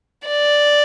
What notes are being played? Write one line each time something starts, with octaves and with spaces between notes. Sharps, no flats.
D5